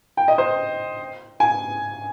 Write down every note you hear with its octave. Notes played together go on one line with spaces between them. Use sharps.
G5
D#5
C5
G#5